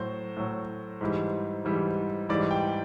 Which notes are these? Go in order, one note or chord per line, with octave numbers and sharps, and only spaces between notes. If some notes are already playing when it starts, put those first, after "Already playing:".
Already playing: A2 F#3 C5
A2 F#3
G#2 E3 G3
G#2 E3 G3
G#2 E3 G3 D5
G5